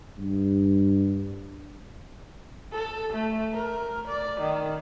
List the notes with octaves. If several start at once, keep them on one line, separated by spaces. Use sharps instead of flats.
G2
A4
A3
A#4
D5
D#3